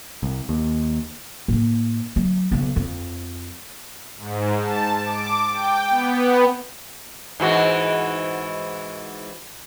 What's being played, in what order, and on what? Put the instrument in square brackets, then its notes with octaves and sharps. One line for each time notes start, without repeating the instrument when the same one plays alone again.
[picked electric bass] C2
D#2
[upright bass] A2 A#3
F#3 A3
B1 C#3
F2
[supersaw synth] G#2
A5
D6
G5
B3
[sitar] G#2 E3 F#4